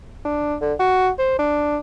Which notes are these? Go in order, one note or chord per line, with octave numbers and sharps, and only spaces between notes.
D4
D3
F#4
C5
D4